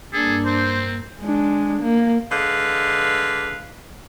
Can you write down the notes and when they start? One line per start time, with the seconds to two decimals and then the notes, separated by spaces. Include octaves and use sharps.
0.13 G2 A#3 D4 G#4 A4
0.45 C4 C5
1.21 G#3 D4
1.83 A#3
2.31 D3 G#3 B4 F5